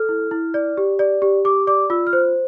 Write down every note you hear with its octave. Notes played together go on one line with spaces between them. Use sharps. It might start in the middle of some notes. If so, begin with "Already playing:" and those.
Already playing: A4 F6
E4
E4
D5
G4
D5
G4
G4 D6
D5 D6
F4 E6
F6
C5